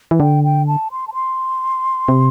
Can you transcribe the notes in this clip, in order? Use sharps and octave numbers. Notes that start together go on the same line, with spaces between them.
E3
D3 G5
G5
A5
C6
A5
C6
C3